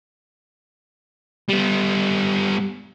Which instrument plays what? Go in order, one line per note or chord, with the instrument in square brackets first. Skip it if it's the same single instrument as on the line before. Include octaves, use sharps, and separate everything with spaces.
[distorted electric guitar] G3 B3